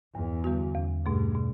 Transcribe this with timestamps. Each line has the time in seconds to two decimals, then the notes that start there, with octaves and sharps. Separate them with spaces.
0.15 E2 G2
0.44 D3 G3 B3 F#4
0.75 E2
1.06 G2 B2 A3
1.35 B2